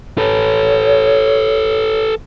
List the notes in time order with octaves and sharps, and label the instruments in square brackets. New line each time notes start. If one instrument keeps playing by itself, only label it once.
[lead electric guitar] A4 B4 [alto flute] C#5